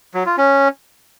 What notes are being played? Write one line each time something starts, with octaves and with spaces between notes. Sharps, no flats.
F#3
F4
C#4